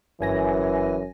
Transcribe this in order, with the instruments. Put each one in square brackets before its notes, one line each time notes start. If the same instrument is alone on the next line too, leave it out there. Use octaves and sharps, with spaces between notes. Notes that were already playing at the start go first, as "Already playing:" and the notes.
[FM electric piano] G1 G#5 A#6 [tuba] F#2 [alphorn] E3